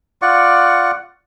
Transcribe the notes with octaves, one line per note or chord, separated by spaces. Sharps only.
F4 D5 F#5 C#6